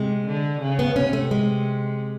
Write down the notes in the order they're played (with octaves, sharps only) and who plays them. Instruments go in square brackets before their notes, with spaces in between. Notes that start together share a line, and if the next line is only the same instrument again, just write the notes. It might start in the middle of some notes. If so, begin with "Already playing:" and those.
Already playing: [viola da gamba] C3 [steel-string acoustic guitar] G#3
[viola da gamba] D3
C#3
[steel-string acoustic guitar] B3
[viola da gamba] C3 [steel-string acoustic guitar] C#4
[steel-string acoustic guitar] A3
G#3